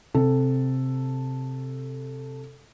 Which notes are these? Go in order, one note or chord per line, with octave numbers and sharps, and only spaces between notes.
C3 A4